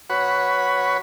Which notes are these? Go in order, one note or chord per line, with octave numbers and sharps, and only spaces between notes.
F#4 B4 C#5